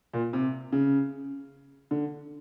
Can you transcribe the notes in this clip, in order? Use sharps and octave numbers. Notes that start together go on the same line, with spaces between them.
A#2
C3
C#3
D3